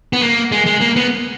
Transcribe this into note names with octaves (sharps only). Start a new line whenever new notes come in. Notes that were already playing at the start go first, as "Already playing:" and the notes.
B3
A#3
G#3
G#3
A#3
B3